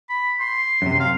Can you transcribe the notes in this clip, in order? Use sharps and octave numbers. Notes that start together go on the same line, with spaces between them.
B5
C6
F#2 C3
F5